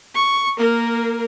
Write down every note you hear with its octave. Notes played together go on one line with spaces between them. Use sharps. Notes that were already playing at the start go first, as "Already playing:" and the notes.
C#6
A#3 A#4